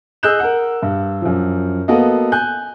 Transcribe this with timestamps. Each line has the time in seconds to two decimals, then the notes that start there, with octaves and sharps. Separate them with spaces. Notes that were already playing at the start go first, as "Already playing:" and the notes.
0.23 G#4 D#5 E6 F#6 G6 E7
0.40 A#4 F#5
0.82 G2
1.22 F#2 F3
1.88 A#3 B3 F#4 A4 D#5
2.32 G#5 F#6 G6